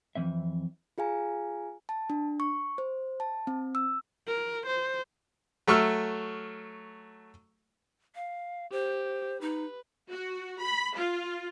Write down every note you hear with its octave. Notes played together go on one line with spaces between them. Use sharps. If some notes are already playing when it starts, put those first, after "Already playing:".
F2 D3 E3 C4 E5
F4 G#4 F5 G#5 A#5
A5
D4
C#6
C5
A5
C4
E6
A#4
C5
F#3 A3 C#6 E6 F6
F5
G4 C5
D#4 B4
F#4
B5
F4